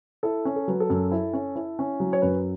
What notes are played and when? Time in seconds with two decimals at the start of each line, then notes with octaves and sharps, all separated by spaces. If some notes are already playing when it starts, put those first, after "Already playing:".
0.23 E4 A4
0.45 C#4
0.56 A4
0.68 F#3 B4
0.80 A4
0.90 F#2
1.12 E4
1.33 C#4
1.56 E4
1.79 C#4
2.00 F#3
2.13 C#5
2.22 F#2 B4